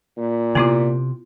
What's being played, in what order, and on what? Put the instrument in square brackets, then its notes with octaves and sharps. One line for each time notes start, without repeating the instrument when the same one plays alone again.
[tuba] A#2
[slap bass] C3 [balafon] B3 E4 F4